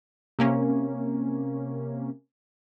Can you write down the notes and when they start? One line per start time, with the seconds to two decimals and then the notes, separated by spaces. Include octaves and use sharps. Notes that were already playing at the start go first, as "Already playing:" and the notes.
0.39 C3 A#3 C#4